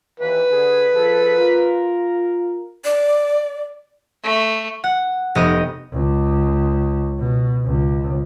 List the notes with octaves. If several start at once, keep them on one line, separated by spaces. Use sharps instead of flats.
D#2 E3 B4
D3 G#4
F3 G#4 A4
F4 A#4
D5
A3
F#5
F1 B3 D#5 G5 D#6
C#2
B2
C#2